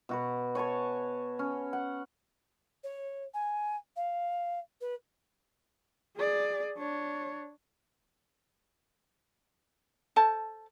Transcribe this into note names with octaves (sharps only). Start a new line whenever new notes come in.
B2 F#4 B4
C#5 G#5 A5 C#6
C#4
F#5
C#5
G#5
F5
B4
G#4 D5
D4 C#5
A4 C5 A5